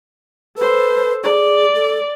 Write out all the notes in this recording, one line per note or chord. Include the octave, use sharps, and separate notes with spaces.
A4 B4 C5
G#4 D5
A4